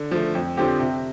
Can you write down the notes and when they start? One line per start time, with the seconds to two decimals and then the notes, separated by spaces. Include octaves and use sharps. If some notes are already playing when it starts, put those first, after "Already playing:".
Already playing: D3
0.12 F3 A3
0.35 F2
0.57 D3 F3 C4 G4
0.80 C3